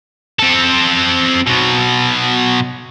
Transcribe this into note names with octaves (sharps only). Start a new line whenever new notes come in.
C4 A4
B2 F#3